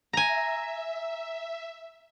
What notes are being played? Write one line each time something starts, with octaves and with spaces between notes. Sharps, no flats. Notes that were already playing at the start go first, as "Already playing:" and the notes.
E5 G#5 A#5